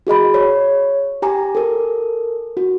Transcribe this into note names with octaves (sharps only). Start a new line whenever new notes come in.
F#4 G#4 D#5 B5
C#5
G4 G#5 A#5 D6
A4 A#4
F#4